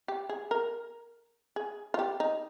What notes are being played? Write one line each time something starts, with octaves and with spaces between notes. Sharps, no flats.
G4
G#4
A#4
G#4
F4
G4
D#4